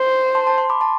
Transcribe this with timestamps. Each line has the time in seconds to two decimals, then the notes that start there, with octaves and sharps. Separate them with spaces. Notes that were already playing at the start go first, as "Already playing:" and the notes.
Already playing: C5
0.35 A5 C6
0.47 A5 C6
0.58 A5 C6
0.69 B5 D6
0.80 A5 C6